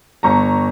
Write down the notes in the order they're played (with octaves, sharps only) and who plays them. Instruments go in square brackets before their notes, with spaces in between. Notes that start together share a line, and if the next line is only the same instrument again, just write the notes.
[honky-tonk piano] G1 A#5 C#6